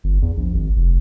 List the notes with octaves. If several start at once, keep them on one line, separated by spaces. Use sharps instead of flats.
G1
E2
A#1
G#1
F1